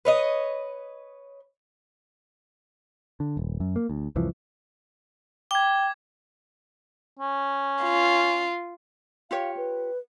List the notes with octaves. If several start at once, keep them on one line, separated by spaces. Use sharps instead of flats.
B4 C#5 D#5
D3
D#1
F#2
A#3
D2
C2 F2 E3 F3
G5 D6 G#6
C#4
F4
F4 G4 C#5 F5
B4